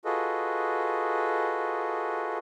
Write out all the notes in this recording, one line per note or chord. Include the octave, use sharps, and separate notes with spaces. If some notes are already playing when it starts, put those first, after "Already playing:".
F4 F#4 G#4 A4 B4 D#5